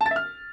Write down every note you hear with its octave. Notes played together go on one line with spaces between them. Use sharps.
A5
A6
E5
F6